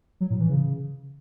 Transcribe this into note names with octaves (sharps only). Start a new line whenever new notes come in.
F#3
A2
E3
C#3